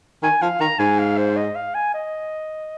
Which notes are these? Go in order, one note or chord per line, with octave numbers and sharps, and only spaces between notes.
D#3 G#5
F3 F5
D#3 A#5
G#2 G#5
F5
C5
D#5
F5
G#5
D#5